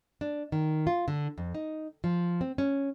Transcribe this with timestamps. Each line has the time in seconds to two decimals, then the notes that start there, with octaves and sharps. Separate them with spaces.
0.21 D4
0.52 D#3
0.87 F4
1.08 D3
1.38 F2
1.55 D#4
2.04 F3
2.41 C4
2.58 C#4